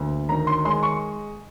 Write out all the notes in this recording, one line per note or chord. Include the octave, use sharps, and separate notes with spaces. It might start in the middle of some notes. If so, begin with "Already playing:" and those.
Already playing: D2 A#3
D#3 A#5
C6
G#3 C6
C#6